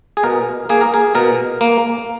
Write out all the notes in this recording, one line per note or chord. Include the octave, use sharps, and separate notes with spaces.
G#4
B2 A#4
A#3 G#4
A#4
G#4
B2 A#4
A#3